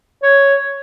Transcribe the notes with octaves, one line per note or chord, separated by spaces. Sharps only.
C#5